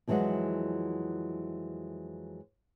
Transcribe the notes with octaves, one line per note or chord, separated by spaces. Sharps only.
F2 D3 E3 F#3 G#3 F#5